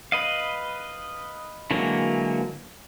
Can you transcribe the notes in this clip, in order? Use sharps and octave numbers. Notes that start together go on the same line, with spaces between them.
B4 D#5 F5
D3 E3 F#3 G#3 A#3